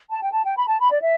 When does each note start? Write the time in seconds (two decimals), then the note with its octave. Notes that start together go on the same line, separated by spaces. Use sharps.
0.10 A5
0.22 G5
0.33 A5
0.44 G5
0.56 B5
0.67 A5
0.79 B5
0.91 D5
1.02 E5